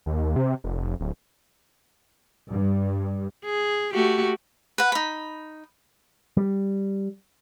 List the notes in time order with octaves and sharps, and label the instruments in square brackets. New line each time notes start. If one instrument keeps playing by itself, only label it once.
[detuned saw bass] D#2
C3
F1
D1
[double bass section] G2
[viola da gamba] G#4
A3 F#4 G4
[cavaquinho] B4 F#5
D#4 B5
[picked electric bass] G3